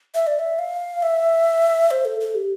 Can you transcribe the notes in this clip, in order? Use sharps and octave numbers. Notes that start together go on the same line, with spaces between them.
E5
D5
E5
F5
E5
C5
A4
A4
G4